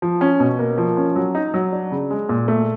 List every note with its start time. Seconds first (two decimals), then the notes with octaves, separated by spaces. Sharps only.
0.02 F3
0.21 C#4
0.40 B2
0.59 A#3
0.78 F3
0.97 C#4
1.16 F#3
1.35 D#4
1.54 F#3
1.72 D4
1.92 C#3
2.11 G#3
2.29 A#2
2.48 A3